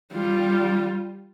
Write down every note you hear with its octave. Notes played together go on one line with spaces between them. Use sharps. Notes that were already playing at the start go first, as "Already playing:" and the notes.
G3 F4